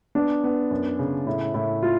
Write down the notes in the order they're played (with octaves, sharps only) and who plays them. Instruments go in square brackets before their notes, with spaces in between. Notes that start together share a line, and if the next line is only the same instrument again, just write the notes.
[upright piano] B3 [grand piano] D4
[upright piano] B3
F#2
C#3
[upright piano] A2 [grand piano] E4
[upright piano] A2 [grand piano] E4
[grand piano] F4